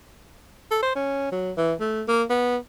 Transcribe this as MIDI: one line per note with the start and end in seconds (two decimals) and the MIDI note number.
0.71 0.79 69
0.83 0.91 72
0.95 1.31 61
1.32 1.52 54
1.57 1.73 52
1.80 2.02 57
2.08 2.23 58
2.30 2.57 59